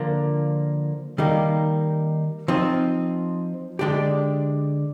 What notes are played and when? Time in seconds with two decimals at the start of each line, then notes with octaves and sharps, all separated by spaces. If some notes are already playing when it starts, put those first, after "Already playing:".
Already playing: D3 F3 A#3
1.18 D#3 G3 A#3 D#4
2.48 F3 C4 D#4
3.79 D3 G#3 D4 G4